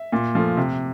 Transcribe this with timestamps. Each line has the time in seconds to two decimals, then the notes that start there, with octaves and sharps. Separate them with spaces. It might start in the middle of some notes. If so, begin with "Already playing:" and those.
Already playing: E5
0.12 A#2
0.35 F3 A3
0.57 C3